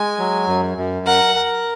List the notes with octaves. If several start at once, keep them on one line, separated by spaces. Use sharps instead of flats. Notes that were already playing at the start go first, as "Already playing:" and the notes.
Already playing: G#3 G#5
F#3
F#2
F#2
A#4 F#5
A#4